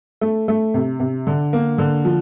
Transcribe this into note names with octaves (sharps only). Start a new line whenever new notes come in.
A3
A3
C3
C3
D3
A#3
D3
F3